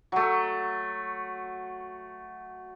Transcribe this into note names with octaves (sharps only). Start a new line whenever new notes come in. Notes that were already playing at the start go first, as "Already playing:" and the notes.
F#3 A3